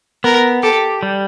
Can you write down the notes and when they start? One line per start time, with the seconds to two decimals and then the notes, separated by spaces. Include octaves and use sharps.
0.24 B3 A#4
0.63 G4 A4
1.03 G3